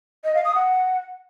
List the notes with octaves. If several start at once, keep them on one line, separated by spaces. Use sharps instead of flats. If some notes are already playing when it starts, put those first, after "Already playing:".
D#5
F5
D#6
F#5